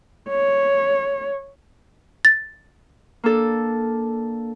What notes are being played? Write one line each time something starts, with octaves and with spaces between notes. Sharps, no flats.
C#5
A6
A#3 D4 A4